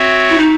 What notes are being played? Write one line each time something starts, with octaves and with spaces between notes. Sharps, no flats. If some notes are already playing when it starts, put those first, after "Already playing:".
Already playing: C4 F#4 C#5 E5
E4
D#4